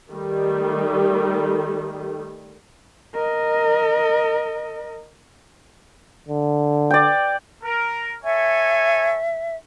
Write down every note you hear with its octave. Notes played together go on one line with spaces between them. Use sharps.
D#3 G3 A3
A#4 D#5
D3
D5 G5
A#4
A4 C#5 E5 G#5